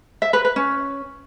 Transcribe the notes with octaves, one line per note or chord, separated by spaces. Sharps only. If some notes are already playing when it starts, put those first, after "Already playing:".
E5
B4
B4
C#4